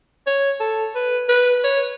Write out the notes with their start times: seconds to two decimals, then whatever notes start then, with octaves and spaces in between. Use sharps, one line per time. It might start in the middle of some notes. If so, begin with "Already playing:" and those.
0.27 C#5
0.60 A4
0.95 B4
1.29 B4
1.64 C#5